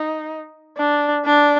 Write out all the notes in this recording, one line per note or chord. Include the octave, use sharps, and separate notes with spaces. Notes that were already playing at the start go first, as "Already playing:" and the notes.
Already playing: D#4
D4
D4